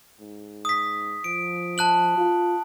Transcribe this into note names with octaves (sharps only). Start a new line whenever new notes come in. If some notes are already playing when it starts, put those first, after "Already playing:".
G#2
D#6 B6
F3 D7
A5 F#6 F#7
F4